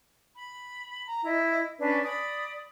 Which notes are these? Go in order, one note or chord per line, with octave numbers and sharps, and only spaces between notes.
B5
A#5
E4 D#5
C#4 D4 B4 D5
D5 B5 D#6